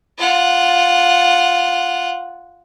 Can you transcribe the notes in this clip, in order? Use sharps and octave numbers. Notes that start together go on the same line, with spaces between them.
F4 F#5